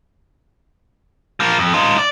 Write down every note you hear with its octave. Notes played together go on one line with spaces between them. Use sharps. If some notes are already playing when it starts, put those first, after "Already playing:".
F3 A#3
F2
D#4 F4
D5